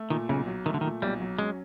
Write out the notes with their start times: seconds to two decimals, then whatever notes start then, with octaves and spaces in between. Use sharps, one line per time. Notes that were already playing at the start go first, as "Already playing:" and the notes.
Already playing: A3
0.10 A#2 D#3
0.29 B1 C#3
0.47 F#3
0.66 D#3 A3
0.74 D3
0.81 D#3
0.84 A#2
1.02 B1 G3
1.20 F#3
1.39 G#3 C#4